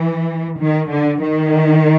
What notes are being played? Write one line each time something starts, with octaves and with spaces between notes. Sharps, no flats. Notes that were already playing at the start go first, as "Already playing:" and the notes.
Already playing: E3
D#3
D3
D#3